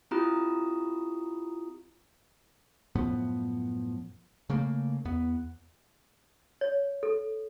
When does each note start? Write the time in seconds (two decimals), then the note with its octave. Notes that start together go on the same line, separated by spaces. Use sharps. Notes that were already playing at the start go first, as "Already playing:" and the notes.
0.11 C4 E4 F4 G4 A#5 D#6
2.95 F#2 A2 F3 B3
4.50 C#3 A3 A#3
5.05 E2 B3
6.61 C#5
7.03 A4